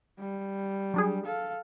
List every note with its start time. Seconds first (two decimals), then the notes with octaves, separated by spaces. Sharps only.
0.19 G3
0.94 F#3 D4 G#4
1.25 A4 F5